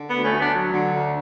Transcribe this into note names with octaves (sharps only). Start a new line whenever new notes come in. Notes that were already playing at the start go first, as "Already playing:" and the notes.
Already playing: D3
D2 B3
A3 C#4
D2
B3 D4
F#3
D3
D2